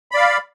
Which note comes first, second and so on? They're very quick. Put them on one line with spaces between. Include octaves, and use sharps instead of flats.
B5 D5 F5